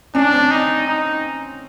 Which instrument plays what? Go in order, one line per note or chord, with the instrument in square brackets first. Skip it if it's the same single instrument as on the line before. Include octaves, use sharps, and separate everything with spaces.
[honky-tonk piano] C#4 [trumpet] D4
[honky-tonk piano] C4
[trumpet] D#4
D#4